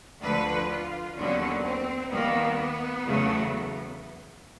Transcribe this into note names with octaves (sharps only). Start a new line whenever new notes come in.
D2 D3 F3 B4
F4
D#2 D3 F#3 B3 C#4
C4
D#2 D#3 G3 A#3 B3
E2 C#3 F#3 A3